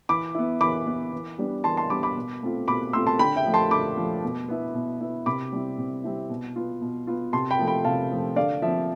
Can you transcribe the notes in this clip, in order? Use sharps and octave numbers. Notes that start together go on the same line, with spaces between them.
E3 B5 D6
B3 E4
E3 B5 D6
B3 E4
E3
G3 B3 D4
E3 A5 C6
A5 C6
G3 B3 D4 B5 D6
B5 D6
B2
A3 C4 F4
B2 B5 D6
A3 C4 F4 C6 E6
A5 C6
D3 G5 B5
E5 G5
F3 A3
A5 C6
D3 B5 D6
F3 A3
B2
B3 E4
B2
B3 E4
C3 B5 D6
G3 C4 E4
C3
G3 C4 E4
B2
B3 F4
B2
B3 F4
C3 A5 C6
G5 B5
F3 A3
G5 B5
C3 F5 A5
F3 A3
D3 D5 F5
F3 C4 E5